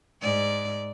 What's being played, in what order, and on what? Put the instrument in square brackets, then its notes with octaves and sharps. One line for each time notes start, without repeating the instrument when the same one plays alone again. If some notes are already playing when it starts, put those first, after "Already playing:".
[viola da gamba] G#2 D5